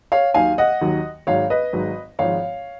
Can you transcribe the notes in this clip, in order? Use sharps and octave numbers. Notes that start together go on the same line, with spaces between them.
C#5 F5
D#2 D#3 F#3 F5 G#5
D#5 F#5
D#2 D#3 F#3
G#1 G#2 F#3 C#5 F5
B4 D#5
G#1 G#2 F#3
G#1 G#2 F3 C#5 F5